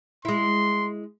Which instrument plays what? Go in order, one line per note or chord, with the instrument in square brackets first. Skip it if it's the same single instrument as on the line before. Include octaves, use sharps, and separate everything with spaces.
[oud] G#3 E4 [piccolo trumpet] C6